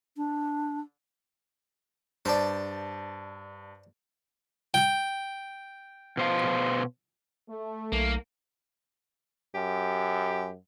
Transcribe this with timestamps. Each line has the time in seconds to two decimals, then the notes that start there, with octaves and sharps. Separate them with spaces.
0.17 D4
2.25 G2 C5 D5 A5
4.74 G5
6.17 B2 C5 F5
7.48 A3
7.92 B1 A#3
9.55 F#2 G4